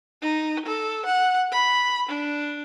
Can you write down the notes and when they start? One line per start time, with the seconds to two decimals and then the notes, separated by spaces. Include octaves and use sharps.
0.22 D#4
0.66 A4
1.06 F#5
1.52 B5
2.09 D4